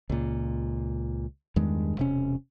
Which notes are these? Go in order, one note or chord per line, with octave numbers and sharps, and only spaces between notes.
C#2 A#2
E2 G2 D#3 G#3
E1 C3 C#4